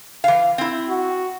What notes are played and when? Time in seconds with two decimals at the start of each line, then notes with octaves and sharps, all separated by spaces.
0.24 E3 F5
0.58 C4 E4
0.88 F#4